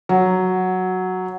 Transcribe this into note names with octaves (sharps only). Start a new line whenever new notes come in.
F#3